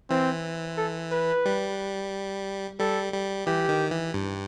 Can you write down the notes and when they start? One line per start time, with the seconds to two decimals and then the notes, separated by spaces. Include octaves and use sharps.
0.10 E3 C4
0.77 A4
1.12 B4
1.45 G3
2.79 G3 A4
3.14 G3
3.47 E3 G4
3.69 D#3
3.91 E3
4.14 G2